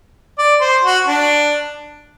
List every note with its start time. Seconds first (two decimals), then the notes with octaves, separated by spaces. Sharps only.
0.39 D5
0.61 C5
0.84 F#4
1.07 D4